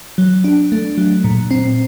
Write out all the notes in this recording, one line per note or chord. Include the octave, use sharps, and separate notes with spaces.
F#3
D4
A3
F#3
A#2
C4